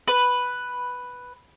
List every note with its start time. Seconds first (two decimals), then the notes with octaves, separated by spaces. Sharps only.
0.08 B4